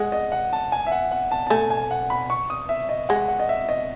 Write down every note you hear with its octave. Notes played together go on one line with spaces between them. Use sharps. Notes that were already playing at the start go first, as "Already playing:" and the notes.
Already playing: G#3 F#5
D#5
F#5
A5
G#5
E5
F#5
F#5
A5
A5
A3 G#5
G#5
F#5
B5
C#6
D#6
E5
D#5
G#3 F#5
F#5
D#5
E5
D#5